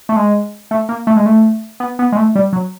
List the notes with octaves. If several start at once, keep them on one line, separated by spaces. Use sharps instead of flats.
A3
G#3
A3
A#3
A3
G#3
A3
B3
B3
G#3
A3
G3
F#3